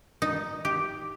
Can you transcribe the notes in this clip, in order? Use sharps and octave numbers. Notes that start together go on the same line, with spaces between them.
D#4
G4